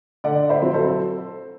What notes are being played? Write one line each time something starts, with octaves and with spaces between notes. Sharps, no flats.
D3 D5 F#5
C5 E5
F#3 C4
A4 C5